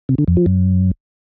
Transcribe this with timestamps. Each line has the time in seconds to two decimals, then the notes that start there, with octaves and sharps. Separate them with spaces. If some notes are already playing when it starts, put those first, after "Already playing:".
0.09 C3
0.18 D3
0.28 F2
0.37 F3
0.46 F#2